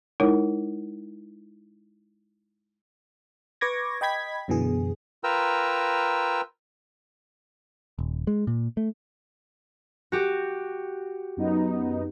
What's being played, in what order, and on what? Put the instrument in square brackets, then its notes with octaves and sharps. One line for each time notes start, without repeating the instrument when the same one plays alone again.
[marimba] G#3 D#4 E4 A#4 C#5
[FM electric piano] B4 C#6 D6 G#6 A#6
D#5 G5 B5 G#6 B6
F#2 B2 D3 E3 G#4
[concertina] F4 A#4 B4 G5 A#5 E6
[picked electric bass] D#1
G#3
A#2
A3
[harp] F#4 G4
[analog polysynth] F#2 B3 D#4